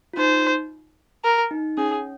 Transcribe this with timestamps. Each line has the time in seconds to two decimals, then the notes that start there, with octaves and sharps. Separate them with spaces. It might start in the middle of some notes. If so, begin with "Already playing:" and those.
0.13 F4
0.17 D#4 C5
1.24 A#4
1.51 D#4
1.77 C#4 G#4